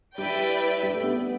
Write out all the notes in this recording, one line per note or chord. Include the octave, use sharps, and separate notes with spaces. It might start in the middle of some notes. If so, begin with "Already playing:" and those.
G3 E4 B4 D5 G5
G3
A3
B3